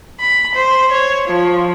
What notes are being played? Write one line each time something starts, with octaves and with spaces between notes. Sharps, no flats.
B5
C5
C#5
F3